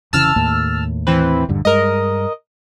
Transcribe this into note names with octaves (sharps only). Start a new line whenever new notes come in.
F1 C#3 E3 A5 E6 F6
D#2 A2 A#3
E3 C4 B4
D#1 G2 D3
G2 G#3 A#4 D#5